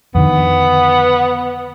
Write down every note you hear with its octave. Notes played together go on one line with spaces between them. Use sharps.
F2 D3 D#3 B3